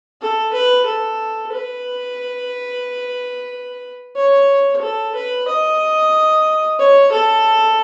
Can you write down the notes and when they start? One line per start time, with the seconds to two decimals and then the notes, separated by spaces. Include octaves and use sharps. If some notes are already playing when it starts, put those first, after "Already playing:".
0.21 A4
0.53 B4
0.86 A4
1.53 B4
4.16 C#5
4.81 A4
5.15 B4
5.48 D#5
6.79 C#5
7.12 A4